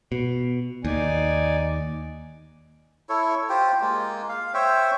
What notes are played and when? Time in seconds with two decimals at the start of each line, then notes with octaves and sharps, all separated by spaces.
0.12 B2
0.85 D#2 D#4 D5 G#5
3.09 E4 A4 C#5
3.49 F4 G4 C5 G5
3.81 G#3 A#3 F4
4.29 F5
4.54 C5 C#5 E5 G5